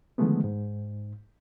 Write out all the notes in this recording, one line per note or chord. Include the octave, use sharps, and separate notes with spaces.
D3 D#3 F3 G#3 A3 B3
G#2